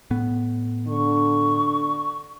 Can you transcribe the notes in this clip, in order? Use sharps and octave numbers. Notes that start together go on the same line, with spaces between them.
A2 B3
D3 C#6